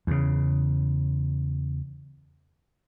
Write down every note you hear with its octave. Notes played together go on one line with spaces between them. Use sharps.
E2 C#3